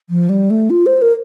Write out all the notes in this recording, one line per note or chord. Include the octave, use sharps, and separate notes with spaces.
F3
G3
A3
F4
C5
A#4